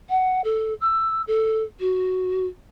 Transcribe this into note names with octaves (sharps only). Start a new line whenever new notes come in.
F#5
A4
E6
A4
F#4